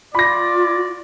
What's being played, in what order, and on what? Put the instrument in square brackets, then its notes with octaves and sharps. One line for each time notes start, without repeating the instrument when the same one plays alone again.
[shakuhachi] F4 [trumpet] D5 [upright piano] B5 A#6